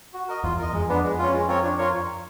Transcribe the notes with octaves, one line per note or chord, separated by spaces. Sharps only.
F#4
A#4 D#5
E2 F4
A#4 D#5
F2 G#3
B3 D4
G#3
C#4 F4
G#3
C4 F4 A#4 C#5
D4
F4 A#4 C#5